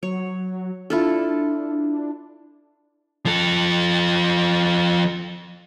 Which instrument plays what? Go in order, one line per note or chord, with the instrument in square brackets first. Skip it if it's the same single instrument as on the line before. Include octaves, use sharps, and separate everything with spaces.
[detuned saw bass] F#3 [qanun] C#5
[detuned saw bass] D4 [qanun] E4 F4 A4
[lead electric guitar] F3 A4